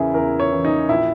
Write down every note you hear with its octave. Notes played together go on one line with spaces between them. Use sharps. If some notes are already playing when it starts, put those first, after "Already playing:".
Already playing: E2 C#3 E3 E4 G#4 A#4
E2 A#4
C#5
C#3 E3
D#4
A#1 E4